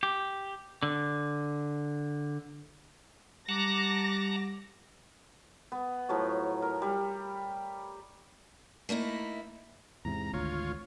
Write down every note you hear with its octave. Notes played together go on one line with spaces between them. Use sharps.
G4
D3
G3 F#5 A5 A#5 D6 A#6
B3
A2 F3 F#3 C#5
A#4
G3
A3 A#3 D#4 E4
E2 G#2 C3 A#5
G#1 D2 F4 C#5